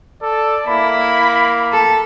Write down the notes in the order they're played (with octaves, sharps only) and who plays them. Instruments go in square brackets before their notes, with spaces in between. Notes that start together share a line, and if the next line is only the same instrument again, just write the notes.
[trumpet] A4 [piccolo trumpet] D5
[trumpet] A#3 [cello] E4 [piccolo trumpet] B5
[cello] A4